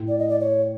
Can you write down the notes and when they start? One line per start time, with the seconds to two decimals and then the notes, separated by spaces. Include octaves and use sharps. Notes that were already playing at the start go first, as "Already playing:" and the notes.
Already playing: A2
0.08 D5
0.18 D#5
0.29 D5
0.40 C#5